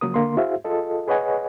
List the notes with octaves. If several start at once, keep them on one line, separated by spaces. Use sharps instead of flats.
C#3 F3 F#3 A#3 A#4 D#6
D3 A#3 C6
E4 F#4 G#4 C5 E5 F5
F4 G#4 A4 D#5
G#4 B4 C#5 D#5 F#5 G#5